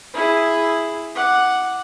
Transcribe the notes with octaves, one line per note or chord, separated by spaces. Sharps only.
E4 G#4
F#5 D6